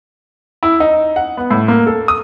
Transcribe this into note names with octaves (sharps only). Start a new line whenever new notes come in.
E4
D#4
F#5
B3
A2
A#3
A4
D#6